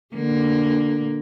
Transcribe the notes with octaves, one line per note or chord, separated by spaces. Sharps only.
D3 A#3